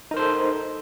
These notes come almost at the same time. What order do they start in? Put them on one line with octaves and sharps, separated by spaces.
D#4 A#4 C5 A4